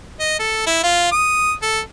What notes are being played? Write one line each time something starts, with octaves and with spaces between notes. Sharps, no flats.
D#5
A4
E4
F4
D#6
A4